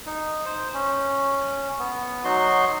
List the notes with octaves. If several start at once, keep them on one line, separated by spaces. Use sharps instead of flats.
D#4
C5
C#4
B3
F#3 D#4 F#4 C6